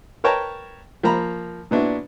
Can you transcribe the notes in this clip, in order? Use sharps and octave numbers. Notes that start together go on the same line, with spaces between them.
A#4 B4 C#5 G5 A5 A#5
F3 A#3 A#5 B5
A#2 B3 D4 E4 F#4